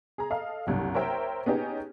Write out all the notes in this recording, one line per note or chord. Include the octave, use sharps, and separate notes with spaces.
G#4 A#5
A4 D#5 F5
F#1 C2 G2
A#4 C5 C#5 E5 G5
B3 C#4 D#4 G4 G#4